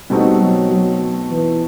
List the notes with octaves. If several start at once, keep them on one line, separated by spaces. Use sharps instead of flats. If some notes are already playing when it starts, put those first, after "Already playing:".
B2 G3 A3 C4 D#4 F#4
F#3
F#3
E3